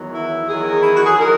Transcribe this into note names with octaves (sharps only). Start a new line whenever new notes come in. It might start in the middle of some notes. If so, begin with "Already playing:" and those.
Already playing: E2 D#3 F#3
E4
E2 D#3 F#3 G#4
D#4
E4
F#4
G#4
D#3 F#3 A#4